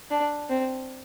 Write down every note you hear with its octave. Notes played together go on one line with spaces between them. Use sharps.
D4
C4